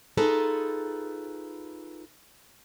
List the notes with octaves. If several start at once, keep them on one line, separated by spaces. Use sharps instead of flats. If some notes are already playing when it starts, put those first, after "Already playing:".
D#4 F4 G#4 A4 B4